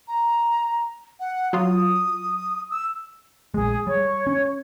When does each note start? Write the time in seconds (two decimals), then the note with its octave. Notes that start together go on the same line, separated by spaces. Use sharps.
0.08 A#5
1.20 F#5
1.53 F#3 F4 D#6
2.71 E6
3.54 A#1 G#3 G#4
3.87 G3 C#5
4.27 C#4